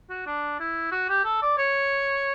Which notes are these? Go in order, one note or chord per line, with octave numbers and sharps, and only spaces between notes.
F#4
D4
E4
F#4
G4
A4
D5
C#5